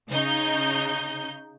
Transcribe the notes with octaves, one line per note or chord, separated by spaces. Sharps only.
C#3 D#4 G6